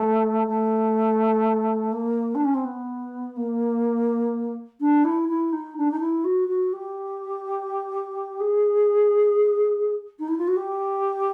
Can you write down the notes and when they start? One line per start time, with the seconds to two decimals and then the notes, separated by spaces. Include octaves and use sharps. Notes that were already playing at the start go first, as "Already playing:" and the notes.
Already playing: A3
0.47 A3
1.92 A#3
2.34 D4
2.44 C#4
2.54 C4
2.64 B3
3.36 A#3
4.80 D4
5.04 E4
5.28 E4
5.52 D#4
5.77 D4
5.91 D#4
6.00 E4
6.24 F#4
6.48 F#4
6.72 G4
8.40 G#4
10.19 D#4
10.28 E4
10.38 F4
10.47 F#4
10.56 G4